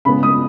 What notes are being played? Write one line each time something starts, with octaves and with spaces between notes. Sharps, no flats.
C#3 G#3 B3 B5
D#6